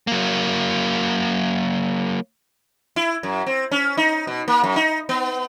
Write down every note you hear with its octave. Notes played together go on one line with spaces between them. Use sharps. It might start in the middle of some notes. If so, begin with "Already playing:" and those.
F#3 A#3
E4
F#2
C4
C#4
D#4
B2
A#3
F#2
D#4
B3